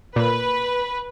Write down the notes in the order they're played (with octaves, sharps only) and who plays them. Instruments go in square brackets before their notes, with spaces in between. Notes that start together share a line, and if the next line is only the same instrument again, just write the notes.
[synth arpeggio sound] A#2 [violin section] B4